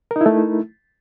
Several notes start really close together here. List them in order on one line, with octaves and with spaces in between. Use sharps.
A#4 D#4 E4 A3